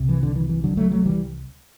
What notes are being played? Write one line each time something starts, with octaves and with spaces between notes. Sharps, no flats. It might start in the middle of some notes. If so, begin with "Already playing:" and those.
Already playing: C2 C3
E3
D3
E3
E3
D3 F#3
F#3 A3
F#3 A3
E3 G3